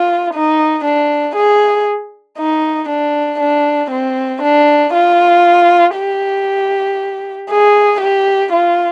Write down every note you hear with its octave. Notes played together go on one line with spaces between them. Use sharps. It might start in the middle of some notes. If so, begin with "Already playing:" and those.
Already playing: F4
D#4
D4
G#4
D#4
D4
D4
C4
D4
F4
G4
G#4
G4
F4